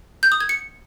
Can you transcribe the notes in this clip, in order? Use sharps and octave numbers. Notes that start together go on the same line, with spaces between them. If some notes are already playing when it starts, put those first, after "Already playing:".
G6
D#6
G#6
C#7